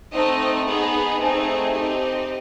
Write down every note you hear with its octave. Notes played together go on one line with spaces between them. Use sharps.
A3 C4 D#4 D#5
B3 D#4 G#4 D#5
A3 C4 D#4 G#4
C4 D#4 G4